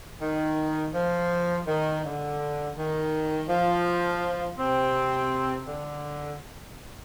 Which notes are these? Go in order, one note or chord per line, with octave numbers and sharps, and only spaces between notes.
D#3
F3
D#3
D3
D#3
F3
C3 C4
D3